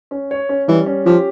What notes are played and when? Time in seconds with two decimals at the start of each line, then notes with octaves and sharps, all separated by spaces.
0.11 C#4
0.31 C#5
0.49 C#4
0.68 E3 G3
0.86 C#4
1.06 F3 G4